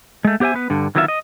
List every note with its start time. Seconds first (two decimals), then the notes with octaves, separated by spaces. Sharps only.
0.25 G#3 A3
0.40 B3 G4 C5 E5 G#5
0.54 B3 B4
0.70 G2 D3
0.95 D3 D#3 F#3 B3 F4 E5
1.08 D#5